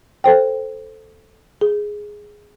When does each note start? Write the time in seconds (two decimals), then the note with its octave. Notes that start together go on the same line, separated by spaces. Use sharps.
0.24 A4 C5 G5
1.61 G#4